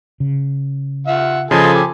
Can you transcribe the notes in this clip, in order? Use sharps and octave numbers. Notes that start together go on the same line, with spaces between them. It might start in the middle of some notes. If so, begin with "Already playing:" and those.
C#3
F4 E5 F#5
C#3 F3 A4 D#5 G#5 A5 C6
G4